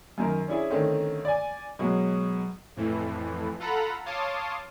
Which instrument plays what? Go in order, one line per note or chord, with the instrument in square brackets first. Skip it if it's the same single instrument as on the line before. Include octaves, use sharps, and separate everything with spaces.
[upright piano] F#2 D#3 A#4
C#4 D4 E4 G#4
D3 D#3 A3 C4 C#4 D#4
D5 G#5
B2 F#3 G#3
[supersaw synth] F2 A2 E3
F4 A4 F#5 A#5 B5
C#5 F5 A5 C6 D6 D#6